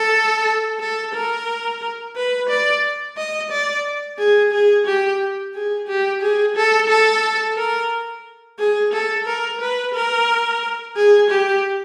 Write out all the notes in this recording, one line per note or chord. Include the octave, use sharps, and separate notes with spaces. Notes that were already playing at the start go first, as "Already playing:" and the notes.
Already playing: A4
A4
A#4
B4
D5
D#5
D5
G#4
G#4
G4
G#4
G4
G#4
A4
A4
A#4
G#4
A4
A#4
B4
A#4
G#4
G4